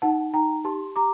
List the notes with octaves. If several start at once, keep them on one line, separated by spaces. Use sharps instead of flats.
D#4 F#5 A5
D#4 G5 A#5
G4 A5 C6
G4 A#5 D6